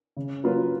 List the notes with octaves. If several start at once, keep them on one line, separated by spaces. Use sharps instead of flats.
C#3
F#3 A#3 F4 B4